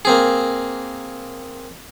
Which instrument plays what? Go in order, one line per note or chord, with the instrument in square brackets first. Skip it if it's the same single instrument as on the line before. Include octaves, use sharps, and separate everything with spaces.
[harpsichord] A#3 C4 G#4